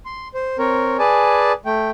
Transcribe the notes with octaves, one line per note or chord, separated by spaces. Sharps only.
C6
C5
C4 A#4 C#5
G#4 B4 D5 G#5 A5
A3 G5